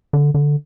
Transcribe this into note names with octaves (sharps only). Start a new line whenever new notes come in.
D3
D3